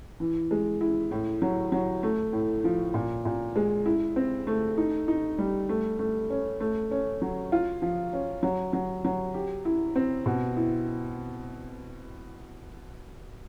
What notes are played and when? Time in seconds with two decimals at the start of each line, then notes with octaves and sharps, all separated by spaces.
0.20 E3
0.51 G#3
0.81 E4
1.11 A2
1.42 F#3
1.72 F#3
2.03 A3
2.33 A2
2.64 F3
2.94 A#2
3.25 A#2
3.56 G#3
3.86 E4
4.16 C4
4.47 A3
4.78 D#4
5.08 D#4
5.38 G3
5.69 A3
5.99 A3
6.30 C#4
6.60 A3
6.91 C#4
7.22 F#3
7.52 F4
7.82 F3
8.13 C#4
8.43 F#3
8.73 F#3
9.05 F#3
9.34 G4
9.65 E4
9.96 C4
10.26 B2
10.57 E4